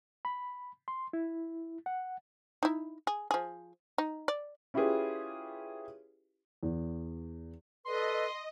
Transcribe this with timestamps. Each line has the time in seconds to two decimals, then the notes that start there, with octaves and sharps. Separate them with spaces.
0.25 B5
0.88 C6
1.13 E4
1.86 F#5
2.63 D#4 E4
3.07 G#4
3.31 F3 G#4
3.98 D#4
4.28 D5
4.74 C#4 E4 F4 G4 G#4 B4
6.63 E2
7.86 A4 B4 D5 D#5 C6